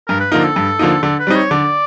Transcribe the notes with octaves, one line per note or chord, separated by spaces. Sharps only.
G2 A#4
B4
D3 F3 A#3 D#4 A#4
A4
G2
D3 F3 A#3 D#4
D3 A4
B4
G3 C4 D#4
C#5
D3 D5